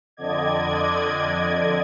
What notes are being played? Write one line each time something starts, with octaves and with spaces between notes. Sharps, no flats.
F2 D3 D5 D#5 G#6